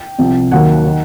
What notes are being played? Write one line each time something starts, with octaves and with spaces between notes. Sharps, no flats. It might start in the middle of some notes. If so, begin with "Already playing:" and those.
Already playing: G5
C2 C3 F3
D#2 D#3 F#3 A#3 F#5
D#3